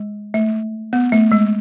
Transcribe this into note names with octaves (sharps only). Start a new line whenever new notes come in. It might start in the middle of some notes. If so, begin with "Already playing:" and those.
Already playing: G#3
A3
B3
A3
G#3